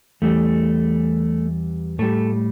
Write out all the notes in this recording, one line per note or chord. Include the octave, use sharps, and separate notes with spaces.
E2 E3 G3 A3
A2 G3 A3